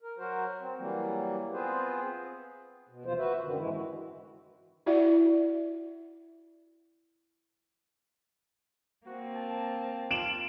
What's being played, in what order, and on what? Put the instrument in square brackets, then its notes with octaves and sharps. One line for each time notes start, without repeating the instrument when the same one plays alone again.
[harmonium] A#4
F#3 F#4 A#4 C5
C4
E3 F#3 G3 A#3
B3 C4 F4 G#4 B4 C5
B2
D#2 C3 E3 F3 F4 C5
F#4 B4 E5
F#2 D3 D#3
G#2 E3 G#3 E4
F#4
[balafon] E4 F#4 D5 E5 F#5
[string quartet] A#3 C4 [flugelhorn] F#4
[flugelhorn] A5
[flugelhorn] F4 [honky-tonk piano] D7 E7 F#7